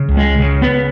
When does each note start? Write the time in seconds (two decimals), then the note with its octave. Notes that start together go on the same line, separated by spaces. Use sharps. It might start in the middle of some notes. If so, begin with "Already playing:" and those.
Already playing: C#3
0.09 C#2
0.17 G#3
0.39 C#3
0.62 B3